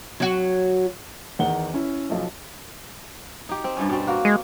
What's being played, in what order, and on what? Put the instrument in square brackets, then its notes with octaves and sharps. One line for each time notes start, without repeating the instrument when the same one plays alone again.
[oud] F#3 F#4
[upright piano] E2 D#3 F#5 G7
C#4 E4
B1 F3
[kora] D#4 G4
C4
G2 G3 C#4
B2 G3 C4
A#3 F#4
[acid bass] G#3